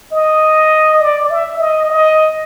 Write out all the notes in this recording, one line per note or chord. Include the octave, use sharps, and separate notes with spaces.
D#5
D5
E5
D#5
D#5